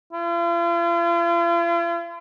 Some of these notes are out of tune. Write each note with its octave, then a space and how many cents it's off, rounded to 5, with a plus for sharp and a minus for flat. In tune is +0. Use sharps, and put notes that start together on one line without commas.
F4 -45